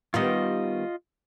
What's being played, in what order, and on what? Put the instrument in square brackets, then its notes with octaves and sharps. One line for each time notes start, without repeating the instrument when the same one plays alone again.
[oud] D#3 G3 B3 [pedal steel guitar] F4 D#5